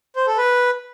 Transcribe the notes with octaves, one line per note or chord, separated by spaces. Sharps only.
C5
A4
B4